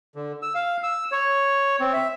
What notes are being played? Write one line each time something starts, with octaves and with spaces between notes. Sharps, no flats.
D3
E6
F5
E6
C#5
C4
E5